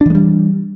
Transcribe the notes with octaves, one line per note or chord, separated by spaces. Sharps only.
E3 G3 G#3 D4